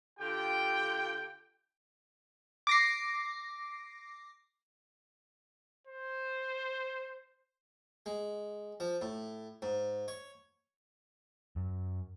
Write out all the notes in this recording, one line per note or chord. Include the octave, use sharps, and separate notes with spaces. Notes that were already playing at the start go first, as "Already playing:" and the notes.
D3 F4 G4 G5
D6 A#6 C7
C5
G#3
F3
A2
G#2
C#5
F#2